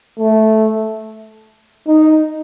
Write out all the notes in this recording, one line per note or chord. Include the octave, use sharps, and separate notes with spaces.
A3
D#4